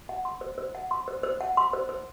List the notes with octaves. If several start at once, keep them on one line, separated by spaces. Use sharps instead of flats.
F#5
C6
C5
C5
F#5
C6
C5
C5
F#5
C6
C5
C5